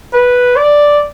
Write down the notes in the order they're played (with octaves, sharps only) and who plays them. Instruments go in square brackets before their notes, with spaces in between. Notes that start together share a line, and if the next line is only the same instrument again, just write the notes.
[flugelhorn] B4
D5